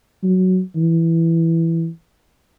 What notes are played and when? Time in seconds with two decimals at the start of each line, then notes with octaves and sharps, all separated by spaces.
0.23 F#3
0.76 E3